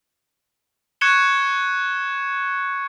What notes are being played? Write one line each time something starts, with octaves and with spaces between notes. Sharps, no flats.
C#6 F#6 G#6 C#7 E7 G7